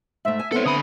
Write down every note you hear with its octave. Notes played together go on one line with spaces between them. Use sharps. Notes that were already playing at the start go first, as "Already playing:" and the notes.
G#2 A3 E5
G#5
B3 C4 A4 C#5 E5
D3 B5 D#6